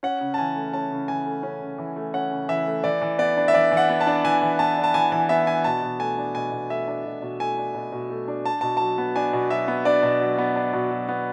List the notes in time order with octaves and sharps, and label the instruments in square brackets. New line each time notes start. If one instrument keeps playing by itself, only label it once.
[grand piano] C#4 F#5
C#3
A5
E3 G#5
A3
C#4 A5
C#3
E3 G#5
A3
C#4
C#3
E3
A3
C#4 F#5
C#3
E3 E5
A3
E3 D5
E3
B3 D5
D4
E5
E3 D5
E3
F#5
B3
A5
D4
E3 G#5
E3
B3 A5
D4
A5
E3 G#5
E3 G#5
B3 E5
D4 G#5
B2 A5
B2
A3 G#5
D4
B2 G#5
B2
A3 E5
D4
B2
B2
A3 G#5
D4
B2
B2
A3
D4
D4 A5
B2 A5
F#3 A5
B3
D4 G#5
B2
F#3 E5
B3
D4 D5
B2
F#3
B3
D4
B2
F#3
B3